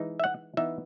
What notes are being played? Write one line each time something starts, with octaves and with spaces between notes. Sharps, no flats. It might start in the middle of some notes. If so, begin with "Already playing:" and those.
Already playing: E3 G#3 D#4
E5
F#5
E3 B3 D#4 E5